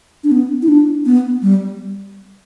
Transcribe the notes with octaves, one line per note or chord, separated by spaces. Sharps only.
D4
B3
E4
D4
B3
G3